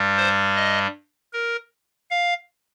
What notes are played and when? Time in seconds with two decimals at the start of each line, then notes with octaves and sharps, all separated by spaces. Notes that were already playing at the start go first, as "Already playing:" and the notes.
Already playing: G2 G3
0.17 C5
0.56 D#5
1.33 A#4
2.11 F5